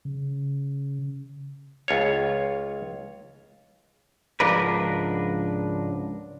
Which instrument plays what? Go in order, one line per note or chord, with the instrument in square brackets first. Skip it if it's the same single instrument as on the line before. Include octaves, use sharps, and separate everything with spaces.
[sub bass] C#3
[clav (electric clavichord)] C#2 F4 C#5
[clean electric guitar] C#2 G#2 F3 D4 A#4 B4